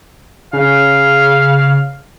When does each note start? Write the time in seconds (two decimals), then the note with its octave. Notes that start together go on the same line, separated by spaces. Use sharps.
0.53 C#3 F5